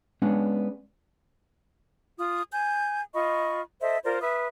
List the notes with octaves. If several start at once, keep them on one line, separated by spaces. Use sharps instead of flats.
G#3 B3 C#4 D4
F4 D#6
G#5 G6
F4 D#5 B5 C#6
A4 C5 D#5 E5
F4 A#4 C5 D5
B4 E5 D#6